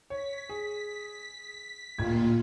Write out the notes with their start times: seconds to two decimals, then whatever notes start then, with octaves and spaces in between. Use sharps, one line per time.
0.10 C#5 B6
0.49 G#4
1.98 D1 A#2 F4 G#6